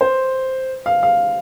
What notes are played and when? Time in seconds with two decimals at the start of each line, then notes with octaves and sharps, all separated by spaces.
0.01 C5
0.86 F5
1.03 F5